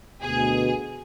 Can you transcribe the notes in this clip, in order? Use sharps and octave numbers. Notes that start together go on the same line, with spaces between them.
D2 B2 G#4